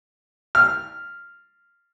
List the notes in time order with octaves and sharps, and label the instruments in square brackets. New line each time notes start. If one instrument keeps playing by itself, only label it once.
[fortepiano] F6